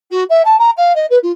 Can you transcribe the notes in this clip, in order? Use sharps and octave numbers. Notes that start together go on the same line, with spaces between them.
F#4
E5
A5
A#5
F5
D#5
B4
F4